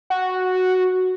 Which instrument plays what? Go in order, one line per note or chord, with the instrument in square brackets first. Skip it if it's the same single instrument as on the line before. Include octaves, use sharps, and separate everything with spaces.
[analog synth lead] F#4